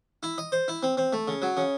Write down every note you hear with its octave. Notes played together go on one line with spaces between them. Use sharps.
E4
D#5
C5
E4
C4
C4
A3
C#3
F#3
C#3